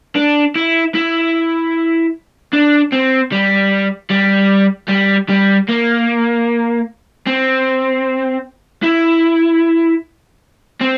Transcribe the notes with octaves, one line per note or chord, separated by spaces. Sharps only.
D4
E4
E4
D4
C4
G3
G3
G3
G3
A#3
C4
E4
C4